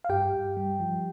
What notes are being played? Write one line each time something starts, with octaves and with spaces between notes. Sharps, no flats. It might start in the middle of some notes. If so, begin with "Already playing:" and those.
F5
G2 G4 G5
G2
G3
F3